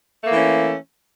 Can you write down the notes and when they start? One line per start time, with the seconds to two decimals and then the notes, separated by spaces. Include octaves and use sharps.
0.22 A3
0.27 A#3
0.32 E3
0.36 C#4